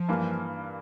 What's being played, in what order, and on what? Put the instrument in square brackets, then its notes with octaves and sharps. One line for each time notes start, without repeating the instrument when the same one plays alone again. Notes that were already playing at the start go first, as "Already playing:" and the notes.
Already playing: [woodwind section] F3
[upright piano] G2 E3 A#3